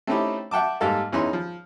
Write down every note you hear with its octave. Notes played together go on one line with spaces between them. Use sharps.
A3 C4 C#4 D#4 E4 G4
E5 F#5 G5 A5 D6
G#2 G3 A#3 A4 A#4 F5
E2 E3 C#4 D#4 C#5 C6
F3